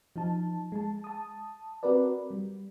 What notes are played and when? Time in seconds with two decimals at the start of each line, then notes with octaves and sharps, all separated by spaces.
0.16 F3 D#4 A5
0.72 G#3 A5
1.04 A5 D#6
1.83 C4 F#4 A#4 B4 D5
2.30 G3